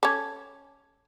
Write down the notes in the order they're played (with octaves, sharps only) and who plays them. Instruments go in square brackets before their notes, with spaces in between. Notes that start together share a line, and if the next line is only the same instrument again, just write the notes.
[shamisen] C#4 A4 [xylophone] D6 G#6